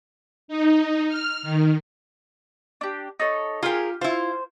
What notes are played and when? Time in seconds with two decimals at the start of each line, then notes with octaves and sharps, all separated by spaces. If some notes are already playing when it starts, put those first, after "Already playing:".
0.48 D#4
1.09 F6
1.43 D#3
2.81 D4 G4
3.20 D#4 A4 C#5
3.63 F4 G4 G#4 A#4 G#5
4.01 E4 F4 C5